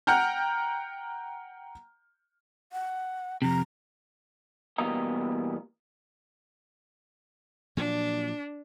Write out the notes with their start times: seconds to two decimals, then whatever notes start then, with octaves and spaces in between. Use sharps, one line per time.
0.07 F#5 G5 A#5 F6 G6
2.73 F#5
3.42 F2 C3 A#5
4.78 E2 B2 G3 A#3 D#5 A#5
7.77 A#2 F3 F#3 D4